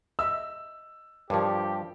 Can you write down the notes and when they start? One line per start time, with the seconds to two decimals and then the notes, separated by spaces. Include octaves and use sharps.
0.19 D#5 E5 E6
1.30 G2 F3 F4 G4 A#4 C#5